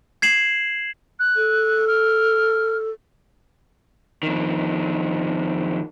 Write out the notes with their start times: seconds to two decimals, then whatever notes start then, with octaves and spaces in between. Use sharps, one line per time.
0.22 G#6 C7 E7 F#7
1.19 F#6
1.36 A4
1.87 F6
4.23 F2 D#3